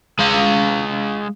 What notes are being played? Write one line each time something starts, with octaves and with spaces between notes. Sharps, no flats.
G#3 F5